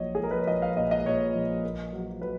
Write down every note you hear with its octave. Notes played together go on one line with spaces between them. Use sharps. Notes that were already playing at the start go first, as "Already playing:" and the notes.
Already playing: A#1 A#2 F#3 C#5 D#5
G#4
A#1 A#4
B4
C#5
A#1 D#5
F5
A#2 D#5
D#5
A#2 C#5
A#1
A#3
F#3
F#3 B4